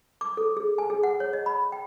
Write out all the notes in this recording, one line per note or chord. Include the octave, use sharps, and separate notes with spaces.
D6
A4
G#4
G#5
G#4
F#5
C#5
D#5
B5
G5